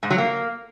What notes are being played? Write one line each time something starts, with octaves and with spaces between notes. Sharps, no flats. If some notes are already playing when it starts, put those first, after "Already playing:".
G#2
F#3
A#3